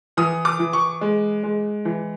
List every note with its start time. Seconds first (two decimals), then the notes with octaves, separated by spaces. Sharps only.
0.17 E3 D#6
0.45 D6
0.59 E3
0.73 C#6
1.01 G#3
1.43 G#3
1.85 E3